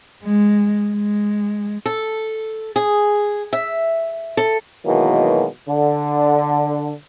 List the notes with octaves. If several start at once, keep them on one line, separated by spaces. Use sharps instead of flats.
G#3
G#3
A4
G#4
E5
A4
B2 D#3 E3 F#3 G#3 A#3
D3